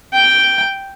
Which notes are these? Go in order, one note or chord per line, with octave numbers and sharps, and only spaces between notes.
G5